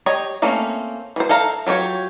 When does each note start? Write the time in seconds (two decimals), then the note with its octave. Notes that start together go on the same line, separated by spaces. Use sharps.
0.06 G4 C#5 D#5
0.42 A3 A#3 C4 C#4
1.16 E3 C5
1.29 A4 E5 F5 A#5
1.66 F#3 F4 G4 C#5